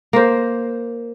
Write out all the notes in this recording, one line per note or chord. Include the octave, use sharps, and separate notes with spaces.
A#3 C5